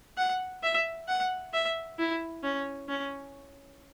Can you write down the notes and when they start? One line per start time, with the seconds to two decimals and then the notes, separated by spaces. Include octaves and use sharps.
0.17 F#5
0.63 E5
1.08 F#5
1.53 E5
1.99 E4
2.43 C#4
2.89 C#4